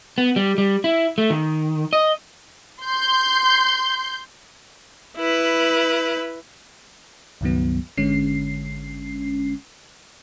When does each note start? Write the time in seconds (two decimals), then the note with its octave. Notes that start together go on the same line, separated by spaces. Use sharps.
0.18 B3
0.36 G3
0.58 G3
0.84 E4
1.18 A3
1.30 D#3
1.93 D#5
2.84 C6 G6
5.17 E4 B4
7.41 C#2 G2 D#3 F#3 B3
7.97 G#1 D3 G#3 C#4 C7